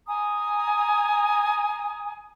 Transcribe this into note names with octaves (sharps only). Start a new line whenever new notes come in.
G#5 A#5 D#6